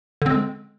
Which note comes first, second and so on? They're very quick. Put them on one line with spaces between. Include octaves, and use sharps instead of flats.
D3 C4 G#3